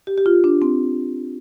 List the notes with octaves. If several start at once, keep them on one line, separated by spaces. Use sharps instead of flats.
G4
G4
F4
D4
C4